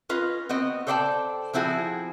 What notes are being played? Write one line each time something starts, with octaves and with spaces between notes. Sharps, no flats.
C#4 F4 B4 D#5
B3 C4 F#4 D#5
A4 C5 D5 F5 G5 A5
F3 C4 E4 F#4 G#4